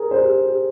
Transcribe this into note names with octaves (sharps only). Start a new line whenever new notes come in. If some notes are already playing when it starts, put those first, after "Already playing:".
Already playing: G#4 A#4
C5
G4
G#4
G4